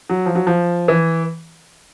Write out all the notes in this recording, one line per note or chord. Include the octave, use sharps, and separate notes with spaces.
F#3
F3
F#3
F3
E3